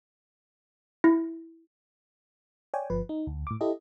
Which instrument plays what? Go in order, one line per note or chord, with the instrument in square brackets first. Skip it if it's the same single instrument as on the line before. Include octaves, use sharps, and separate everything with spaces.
[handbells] E4
[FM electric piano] C#5 D5 G5 G#5
G1 F3 B4
D#4
D2
A2 D6
E4 G4 A4 D#5